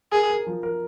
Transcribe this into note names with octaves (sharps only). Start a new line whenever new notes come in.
G#4 A#4
A#4
F3
A#4